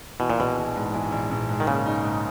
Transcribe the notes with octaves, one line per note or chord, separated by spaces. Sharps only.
B2 E3
A#2
A#1 B2
A#1
G#2
E3
A#1
A#1
G#2
D#3
C#3 A#3
D#4
G#2